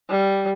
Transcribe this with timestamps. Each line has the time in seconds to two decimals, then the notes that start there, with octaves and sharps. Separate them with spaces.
0.10 G3